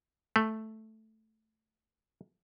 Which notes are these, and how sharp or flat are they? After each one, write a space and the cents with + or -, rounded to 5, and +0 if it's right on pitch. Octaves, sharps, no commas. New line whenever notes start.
A3 +0